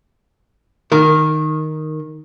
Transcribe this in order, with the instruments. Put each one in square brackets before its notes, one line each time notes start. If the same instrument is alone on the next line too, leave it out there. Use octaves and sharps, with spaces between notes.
[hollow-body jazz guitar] D#3 A#4